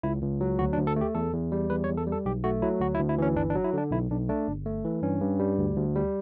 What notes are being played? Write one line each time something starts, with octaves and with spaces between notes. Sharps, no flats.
C#2 E4
C#2
F#3
D2 F#4
D4
D2
A4
A3 G4
E2 A4
E2
G3
E2 B4
C#5
E2
A4
G3
A4
B1 G4
A3 F#4
F#3 E4
D2 F#4
E4
D2
E4
E3 C#4
G1 D4
D4
F#3
E4
D3 D4
B1 E4
B1 D4
A3 D4
G1
A3
E3
G2 C#4
G2
G3
D2
D2
G3